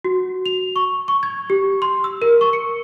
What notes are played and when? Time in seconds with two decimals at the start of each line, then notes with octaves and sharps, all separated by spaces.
0.05 F#4
0.46 F7
0.76 C#6
1.08 C#6
1.23 G#6
1.50 G4
1.82 C6
2.04 E6
2.22 A#4
2.41 C#6
2.53 C#7